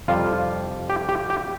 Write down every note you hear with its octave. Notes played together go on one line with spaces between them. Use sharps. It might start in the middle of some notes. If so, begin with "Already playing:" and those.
F2 C3 G3 F4
G4
G4
G4